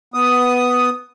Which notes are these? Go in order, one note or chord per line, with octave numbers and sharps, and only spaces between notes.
B3 D#6